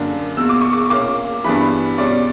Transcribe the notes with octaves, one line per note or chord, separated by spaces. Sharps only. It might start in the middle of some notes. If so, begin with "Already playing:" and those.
Already playing: F#2 D3 F#3 A#3 D4
E2 B2 A#3 E6
D6
C#6
D6
A#2 A#3 C#4 D6
G2 E3 G3 B3 D4 B5
B2 G3 C#4 D5